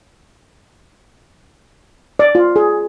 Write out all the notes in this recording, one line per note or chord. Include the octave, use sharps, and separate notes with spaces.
D5
F4
G#4